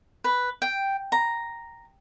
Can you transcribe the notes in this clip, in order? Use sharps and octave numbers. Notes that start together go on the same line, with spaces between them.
B4
G5
A#5